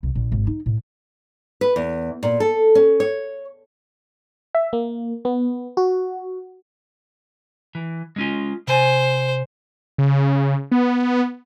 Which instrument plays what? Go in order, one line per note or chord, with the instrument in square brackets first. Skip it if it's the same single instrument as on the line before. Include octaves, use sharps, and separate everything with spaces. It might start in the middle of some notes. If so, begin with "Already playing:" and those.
[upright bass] C2
A#1
G#1
D#4
A2
[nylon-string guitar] B4
E2
A#2
A4
C#4
C#5
[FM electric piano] E5
A#3
B3
F#4
[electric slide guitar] E3
G#3 C#4 F4
[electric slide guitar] C3 G#5 [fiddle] C5
[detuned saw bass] C#3
B3